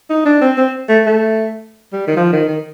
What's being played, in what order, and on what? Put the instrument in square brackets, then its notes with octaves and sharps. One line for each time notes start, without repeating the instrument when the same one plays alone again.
[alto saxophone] D#4
D4
C4
C4
A3
A3
G3
D#3
F3
D#3
D#3